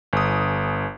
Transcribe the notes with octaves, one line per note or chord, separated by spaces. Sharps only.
G1 D#6